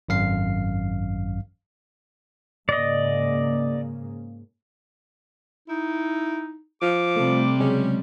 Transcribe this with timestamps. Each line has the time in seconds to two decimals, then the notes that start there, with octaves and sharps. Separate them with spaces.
0.09 G#1 F#2 F5 C7
2.69 G#2 C#3 A#3 D5 D#5
5.68 D#4 E4
6.81 F3 D6
7.16 C3 G3 A3
7.60 C#3 F#3 G#3 C#4